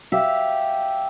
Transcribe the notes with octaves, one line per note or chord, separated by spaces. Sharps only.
G4 E5 F5